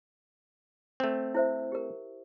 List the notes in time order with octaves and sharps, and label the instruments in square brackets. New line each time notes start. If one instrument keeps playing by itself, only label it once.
[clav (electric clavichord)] A3 C4
[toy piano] E4 C5 E5
G4 A#4